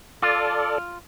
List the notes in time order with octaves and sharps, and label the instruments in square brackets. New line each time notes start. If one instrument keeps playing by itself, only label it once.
[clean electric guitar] F4 [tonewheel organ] A4 D5